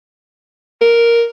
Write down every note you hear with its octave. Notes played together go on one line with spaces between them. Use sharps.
A#4